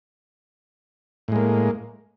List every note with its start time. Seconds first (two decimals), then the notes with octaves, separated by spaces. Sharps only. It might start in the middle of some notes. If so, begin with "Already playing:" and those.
1.28 A2
1.32 G#3
1.36 A#3